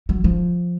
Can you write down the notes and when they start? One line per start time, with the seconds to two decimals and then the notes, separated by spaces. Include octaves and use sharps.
0.09 F#3
0.24 F3